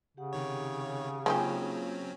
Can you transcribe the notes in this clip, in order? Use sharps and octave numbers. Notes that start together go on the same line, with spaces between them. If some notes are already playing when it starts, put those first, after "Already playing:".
C#3 G4 F#5
C3 D#3 C#5
F#3 G#3 A#3 C4 C#4 D#4 F4 G4